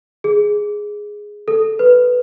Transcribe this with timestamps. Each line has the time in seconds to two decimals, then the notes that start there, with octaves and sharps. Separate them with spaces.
0.24 G#4
1.48 A4
1.79 B4